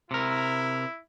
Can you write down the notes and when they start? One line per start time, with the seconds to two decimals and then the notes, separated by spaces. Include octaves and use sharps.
0.11 C3 E4 A#4